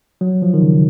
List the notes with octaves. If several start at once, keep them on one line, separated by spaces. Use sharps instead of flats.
F#3
F3
D#3
C#3